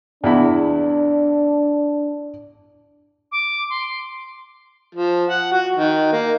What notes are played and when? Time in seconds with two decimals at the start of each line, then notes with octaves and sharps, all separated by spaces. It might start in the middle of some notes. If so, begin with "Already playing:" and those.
0.24 E2 D4 E4 B5
3.32 D6
3.70 C6
4.95 F3
5.30 F#5
5.52 F#4
5.76 D#3
6.12 A#3